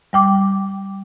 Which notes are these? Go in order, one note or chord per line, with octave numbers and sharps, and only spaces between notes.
G3 G5 D6